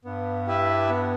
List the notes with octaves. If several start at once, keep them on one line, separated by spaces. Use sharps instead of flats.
G2 B3
E4 G4 B4 E5
B3